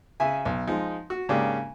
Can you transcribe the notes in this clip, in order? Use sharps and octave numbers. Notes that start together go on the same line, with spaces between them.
C#3 E5 G#5
B1
F3 G#3 D#4
F#4
G#2 C#3 A#3 D4 G4